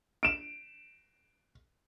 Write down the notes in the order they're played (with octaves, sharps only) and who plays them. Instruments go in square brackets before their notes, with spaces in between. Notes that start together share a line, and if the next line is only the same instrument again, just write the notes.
[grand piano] D7 E7